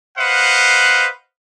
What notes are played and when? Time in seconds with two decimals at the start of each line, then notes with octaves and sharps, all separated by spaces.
0.18 B4 C5 D#5 F5 F#5